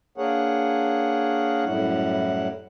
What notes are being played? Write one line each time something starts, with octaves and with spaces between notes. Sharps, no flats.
A#3 D4 G#4 A#4 C#5 F#5
F#2 A2 G3 E4 F#5